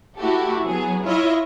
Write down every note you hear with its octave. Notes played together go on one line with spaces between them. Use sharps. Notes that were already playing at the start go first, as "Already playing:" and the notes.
A3 E4 F#4 G4 A4
F#3 B3 G#4
E4 F4 C#5 D#5 E5